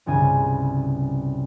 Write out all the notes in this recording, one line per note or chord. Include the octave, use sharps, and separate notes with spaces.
G1 C2 C#3 G#5 D#7